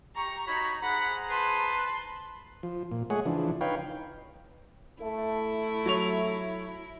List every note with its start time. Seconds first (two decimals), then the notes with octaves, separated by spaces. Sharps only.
0.16 G4 A#5 C#6
0.48 D#4 F#4 C#5 A#5 B5
0.83 G#4 C5 F#5 A#5 B5
1.30 B4 A5 C6
2.63 F3
2.91 A#2
3.10 G#3 A3 G#4 C#5 F#5
3.25 C#3 E3 F3 D4
3.61 D#4 B4 C#5 F5 G5
5.02 A3 E4
5.86 F#3 C#5 F7